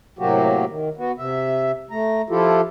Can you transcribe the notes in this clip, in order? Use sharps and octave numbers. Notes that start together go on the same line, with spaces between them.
A2 C3 F#3 A#3 F#4 G4
D#3
B3 F#4
C3 E5
A3 A#5
F3 E4 F4 G4 A4